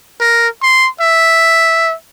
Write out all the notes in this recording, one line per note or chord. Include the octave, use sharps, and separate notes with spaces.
A#4
C6
E5